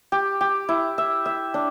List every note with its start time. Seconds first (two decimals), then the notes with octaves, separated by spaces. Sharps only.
0.12 G4
0.41 G4
0.69 E4
0.98 E5
1.26 E5
1.54 D4